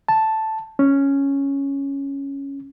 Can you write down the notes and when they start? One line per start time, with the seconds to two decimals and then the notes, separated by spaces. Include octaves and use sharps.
0.08 A5
0.79 C#4